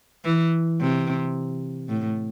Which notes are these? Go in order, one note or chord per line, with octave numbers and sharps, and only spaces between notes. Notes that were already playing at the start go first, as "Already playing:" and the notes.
E3
C3
A2